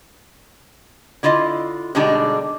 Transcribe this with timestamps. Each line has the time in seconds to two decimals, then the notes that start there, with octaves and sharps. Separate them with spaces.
1.23 D3 E4 F4 D#5
1.95 B2 D3 G3 G#3 D4 D#4